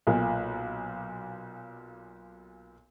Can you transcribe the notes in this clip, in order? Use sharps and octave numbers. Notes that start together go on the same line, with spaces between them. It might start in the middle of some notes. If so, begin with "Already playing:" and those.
B1 A#2